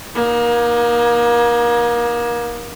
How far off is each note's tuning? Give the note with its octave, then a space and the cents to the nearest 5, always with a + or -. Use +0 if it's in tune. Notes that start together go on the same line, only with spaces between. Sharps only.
A#3 +30 D#4 +0